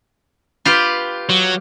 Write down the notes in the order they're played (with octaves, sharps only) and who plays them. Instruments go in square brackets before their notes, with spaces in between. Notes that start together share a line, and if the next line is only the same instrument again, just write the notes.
[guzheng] F4 G4 B4
[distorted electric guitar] F#3